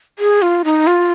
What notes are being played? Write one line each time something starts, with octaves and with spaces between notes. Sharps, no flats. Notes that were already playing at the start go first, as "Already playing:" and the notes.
G#4
F4
D#4
F4